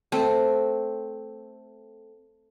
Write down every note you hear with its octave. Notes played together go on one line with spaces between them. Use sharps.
A3 C4